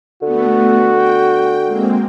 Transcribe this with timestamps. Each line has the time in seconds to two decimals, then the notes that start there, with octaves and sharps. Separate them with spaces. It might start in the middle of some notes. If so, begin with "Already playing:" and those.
0.22 D3 A3 B3 F#4
0.93 G5
1.65 G#3 A#3 C4